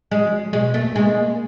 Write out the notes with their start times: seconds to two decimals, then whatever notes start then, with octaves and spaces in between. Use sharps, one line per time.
0.11 F#3 G#3
0.33 F#3
0.53 B2 G#3
0.74 A3 A#3
0.96 G#3 A#3
1.17 A#3